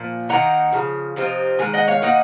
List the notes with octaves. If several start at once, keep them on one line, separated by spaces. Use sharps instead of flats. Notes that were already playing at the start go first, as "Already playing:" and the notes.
Already playing: A#2 F3
D#3 A#3 D#4 F#5 A#5
C#3 F3
C3 F3 C4 D#4
D#3 G#3 G#5
D#5 F#5
C#5 F5
D#3 A#3 D#4 D#5 F#5